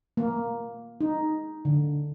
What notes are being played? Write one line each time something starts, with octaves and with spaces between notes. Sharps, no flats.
A#3
D#4
D3